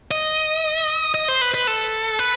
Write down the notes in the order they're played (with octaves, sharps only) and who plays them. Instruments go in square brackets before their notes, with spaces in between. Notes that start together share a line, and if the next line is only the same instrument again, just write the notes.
[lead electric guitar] D#5
D#5
C5
B4
B4
A4
B4